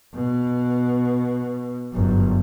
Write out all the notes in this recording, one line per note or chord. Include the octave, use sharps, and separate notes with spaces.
B2
G1 F#2